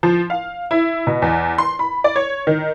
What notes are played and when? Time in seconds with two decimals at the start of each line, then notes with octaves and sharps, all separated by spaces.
0.03 F3
0.30 F5
0.71 E4
1.07 B2
1.22 E2
1.58 C6
1.79 B5
2.04 D5
2.16 C#5
2.47 D#3